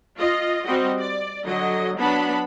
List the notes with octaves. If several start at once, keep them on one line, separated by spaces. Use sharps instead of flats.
F4 D#5
G3 C4 F#4 G4 D#5
D5
D3 F#3 D#5
F#3 B3 D4 A5 B5